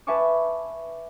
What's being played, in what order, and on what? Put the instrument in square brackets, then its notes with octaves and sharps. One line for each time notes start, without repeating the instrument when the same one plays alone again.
[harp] B4 E5 G#5 A5 C#6 D6